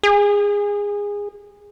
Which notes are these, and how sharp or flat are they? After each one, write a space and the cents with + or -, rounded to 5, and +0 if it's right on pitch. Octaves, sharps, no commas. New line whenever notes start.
G#4 -20